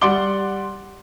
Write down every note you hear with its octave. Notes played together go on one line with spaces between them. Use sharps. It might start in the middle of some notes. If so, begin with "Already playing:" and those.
G3 D5 F#5 C6 D6 G7